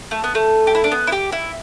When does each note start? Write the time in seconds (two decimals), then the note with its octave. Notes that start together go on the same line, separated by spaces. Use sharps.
0.11 A3
0.24 B3
0.35 A3
0.67 G4
0.75 E4
0.84 D4
0.92 B3
1.07 E4
1.12 G4
1.32 E4